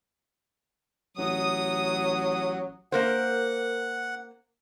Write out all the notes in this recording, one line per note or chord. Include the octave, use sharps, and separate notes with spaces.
A1 F#3 D#6
A#3 A#4 C5 F#5